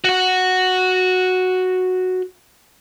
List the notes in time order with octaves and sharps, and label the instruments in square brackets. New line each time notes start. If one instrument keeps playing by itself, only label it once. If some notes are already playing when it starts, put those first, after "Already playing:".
[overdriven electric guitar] F#4 F#5